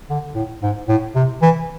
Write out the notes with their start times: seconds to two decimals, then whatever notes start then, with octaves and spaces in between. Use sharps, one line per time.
0.10 D3
0.35 A2
0.62 G#2
0.88 A2
1.15 C3
1.42 E3